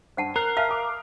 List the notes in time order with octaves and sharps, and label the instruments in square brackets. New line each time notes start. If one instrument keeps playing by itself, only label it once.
[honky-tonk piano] G2 [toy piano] C5 F#5 A5
[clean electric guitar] A#4 [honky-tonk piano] F#6 C7
[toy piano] E5 F5 A5 [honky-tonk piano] F6
[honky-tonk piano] D6 D#6